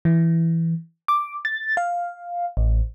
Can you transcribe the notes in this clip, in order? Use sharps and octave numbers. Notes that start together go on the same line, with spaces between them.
E3
D6
A6
F5
A1